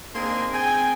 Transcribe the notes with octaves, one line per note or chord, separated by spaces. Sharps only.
A#3 C4 D4 D#4 G#4 C6
C4 G#4 G5 G#5